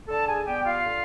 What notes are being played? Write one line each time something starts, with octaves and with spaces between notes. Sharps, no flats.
D3 A4 A5
G#4 G#5
G3 B3 G4 G5
F4 F5
D3